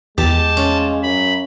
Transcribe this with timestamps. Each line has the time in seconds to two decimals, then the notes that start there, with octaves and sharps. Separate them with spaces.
0.18 E2 G#3 G4 A5
0.57 C#4 F4
1.03 F#2 B5